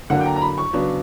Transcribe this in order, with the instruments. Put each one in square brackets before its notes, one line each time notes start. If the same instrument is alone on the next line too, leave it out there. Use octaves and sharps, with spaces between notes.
[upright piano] D3 F#3 A#3 D4 F#5
G5
A#5
A#5
B5
C#6
C#3 F#3 B3 D4